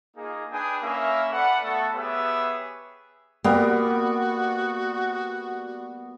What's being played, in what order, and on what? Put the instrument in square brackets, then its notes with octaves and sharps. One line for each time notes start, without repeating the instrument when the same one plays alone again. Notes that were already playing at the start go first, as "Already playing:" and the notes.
[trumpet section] A#3 D#4 F4 G#4
D4 G#4 B4 G5 G#5 D#6
A#3 C#4 E4 A#4 E5
A4 B4 D5 F#5
A3 B3 F#4 A4
B3 G4 G#4 B4 C#5 E5
[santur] G3 B3 [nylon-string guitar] A#3 [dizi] F#4